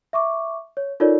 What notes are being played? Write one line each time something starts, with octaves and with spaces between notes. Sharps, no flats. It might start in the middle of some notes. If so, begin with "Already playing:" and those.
E5 C#6 D6
C#5
D#4 F4 A4 A#4 C#5 D5